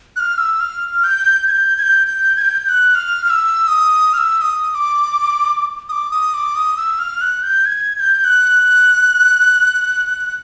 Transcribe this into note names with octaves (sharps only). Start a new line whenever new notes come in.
F#6
F6
E6
F6
G6
G#6
G6
G#6
G6
G6
G#6
G6
G6
F#6
F6
F6
E6
D#6
F6
E6
D#6
D#6
D6
D#6
D6
D#6
D6
D#6
E6
F6
F#6
G6
G#6
G#6
G6
F#6